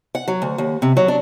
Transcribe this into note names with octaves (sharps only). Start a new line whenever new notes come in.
F#5
F#3
D2
D#2
C3
F#3
D4